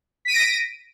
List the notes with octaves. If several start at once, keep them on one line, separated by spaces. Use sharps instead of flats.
A#6 B6 D7 D#7